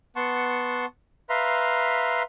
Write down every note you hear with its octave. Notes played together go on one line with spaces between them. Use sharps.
B3 F#5 A5 C6 C#6
B4 E5 F5 A#5 C6